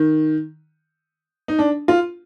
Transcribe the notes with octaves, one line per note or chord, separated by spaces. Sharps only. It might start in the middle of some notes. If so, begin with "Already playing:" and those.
Already playing: D#3
D#4
D4
F4